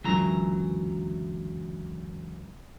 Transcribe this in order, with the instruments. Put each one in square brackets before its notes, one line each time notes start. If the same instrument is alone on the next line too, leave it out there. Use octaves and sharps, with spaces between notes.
[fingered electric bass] C#2 F#2 D3 [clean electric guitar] E3 F#3 A#5